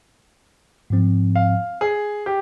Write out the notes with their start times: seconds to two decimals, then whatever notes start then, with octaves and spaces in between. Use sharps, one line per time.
0.90 G#2 F3 C4
1.36 F5
1.81 G#4
2.26 G4